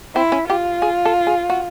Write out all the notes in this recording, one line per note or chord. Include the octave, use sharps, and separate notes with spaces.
C4 E4
C#4
F4 G4
G#4
A4
G#4
F#4